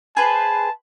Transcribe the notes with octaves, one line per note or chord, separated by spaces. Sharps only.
G#4 B4 C5 A5